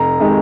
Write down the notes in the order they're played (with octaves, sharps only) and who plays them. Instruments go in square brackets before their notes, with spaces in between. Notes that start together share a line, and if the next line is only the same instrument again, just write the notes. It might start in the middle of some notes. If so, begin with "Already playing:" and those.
Already playing: [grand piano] F1 A#5
C3 D#3 G#3